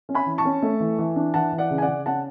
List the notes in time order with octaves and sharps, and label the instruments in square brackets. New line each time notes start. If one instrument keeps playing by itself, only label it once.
[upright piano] C#4
G#5 B5
E3
A5 C#6
C#4
A3
E3
E3
D4
E3 F#5 A5
E3
D5 F#5
C#3
G#5
D5 F#5
C#3
C#4 F#5 A5